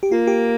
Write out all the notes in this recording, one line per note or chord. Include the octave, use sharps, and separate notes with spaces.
G4
A#3 F4
G4